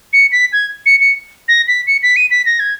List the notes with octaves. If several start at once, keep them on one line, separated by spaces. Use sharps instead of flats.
C#7
B6
G#6
C#7
C#7
A#6
B6
C#7
B6
D#7
B6
A#6
G#6